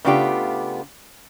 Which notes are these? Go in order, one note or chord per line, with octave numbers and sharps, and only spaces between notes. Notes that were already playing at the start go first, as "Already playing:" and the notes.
C#3 A3 B3 D4 F4 G4